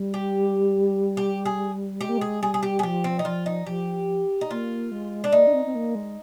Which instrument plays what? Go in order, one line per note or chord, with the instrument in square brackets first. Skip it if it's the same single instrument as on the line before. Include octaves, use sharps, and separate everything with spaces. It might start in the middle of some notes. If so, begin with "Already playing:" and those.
Already playing: [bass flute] G3
[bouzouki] G4
G4
G#4
[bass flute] G#3 [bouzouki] G4
[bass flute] A#3
[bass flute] G#3 [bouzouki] G#4
[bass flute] G3 [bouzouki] G#4
[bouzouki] G#4
G4
G#4
[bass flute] F3 [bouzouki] G4
[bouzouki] C4
D#4
[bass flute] F3 [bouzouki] F4
[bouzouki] D#4
[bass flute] F3 [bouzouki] G4
[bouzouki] D#4
[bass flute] A#3 [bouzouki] F4
[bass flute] G#3
[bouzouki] D4
[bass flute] A#3 [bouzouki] D#4
[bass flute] D4
C4
C4
A#3
G#3